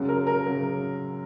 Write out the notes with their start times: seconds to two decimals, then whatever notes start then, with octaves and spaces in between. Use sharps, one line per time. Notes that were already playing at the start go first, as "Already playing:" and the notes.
Already playing: F#2 C#3 F#3
0.09 A#4
0.27 A#4
0.47 C#3 F#3